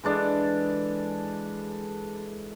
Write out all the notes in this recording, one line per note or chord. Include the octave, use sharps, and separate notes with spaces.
E3 G#3 D4 A4